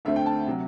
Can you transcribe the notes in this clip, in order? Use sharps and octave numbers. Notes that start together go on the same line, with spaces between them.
D2 D3 A3 C4 E5
G5
A5
C3 F#3